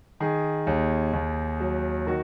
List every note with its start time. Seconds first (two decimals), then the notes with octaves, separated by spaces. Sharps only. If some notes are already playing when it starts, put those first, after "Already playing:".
0.20 D#3 G#4
0.67 D#2
1.13 D#2
1.60 F#3
2.07 D#3 F#4 A#4